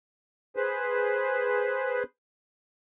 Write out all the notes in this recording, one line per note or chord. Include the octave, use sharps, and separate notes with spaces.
G#4 B4 C5